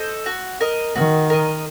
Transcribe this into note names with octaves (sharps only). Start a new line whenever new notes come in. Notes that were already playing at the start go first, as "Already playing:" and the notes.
Already playing: A4 C5 D#5
F#4
A#4 D#5
D#3 F#4
A#4 D#5